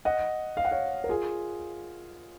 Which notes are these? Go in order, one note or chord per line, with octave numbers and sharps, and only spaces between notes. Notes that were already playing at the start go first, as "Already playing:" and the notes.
D#5 F#5
F5
F#5
C#5 F5
A#4
F4 G#4